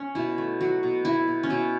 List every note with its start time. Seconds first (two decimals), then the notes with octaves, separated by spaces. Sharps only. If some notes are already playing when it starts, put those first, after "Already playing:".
Already playing: C#4
0.15 B2 E4
0.38 A3
0.61 F#3 F#4
0.83 B2
1.05 B2 E4
1.27 B2
1.43 C#4
1.50 B2 E4